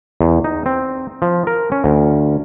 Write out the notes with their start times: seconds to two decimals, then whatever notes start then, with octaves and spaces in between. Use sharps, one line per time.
0.21 E2
0.44 D#4
0.66 C4
1.22 F3
1.47 A#4
1.72 C#4
1.84 D2